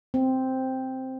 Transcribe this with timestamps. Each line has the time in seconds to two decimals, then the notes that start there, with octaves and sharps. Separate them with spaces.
0.14 C4